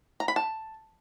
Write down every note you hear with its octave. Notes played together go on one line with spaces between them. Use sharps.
A#5
B5
A5